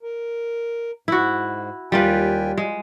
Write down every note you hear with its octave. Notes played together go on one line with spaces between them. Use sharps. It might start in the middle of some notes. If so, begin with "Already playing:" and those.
A#4
G#2 E4 F#4
D#2 G3 F4 B4 G5 G#5
G#3